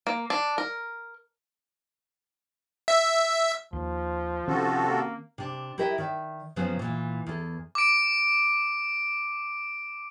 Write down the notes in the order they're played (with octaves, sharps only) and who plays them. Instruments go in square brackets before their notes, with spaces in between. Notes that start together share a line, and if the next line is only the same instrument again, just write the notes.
[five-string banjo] A#3
D4
A#4
[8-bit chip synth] E5
[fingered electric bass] D#2 [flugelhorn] F3
[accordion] C3 F#4 A4 [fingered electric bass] D#3 C4 C#4
[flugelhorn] A#3
[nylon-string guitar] C3 D4
E4 F#4 G4 A#4 D#5 E5
D#3 D5 E5
F#2 C#3 F3 F#3 B3 C4
A#2 E3
E2 A4
[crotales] D6 D7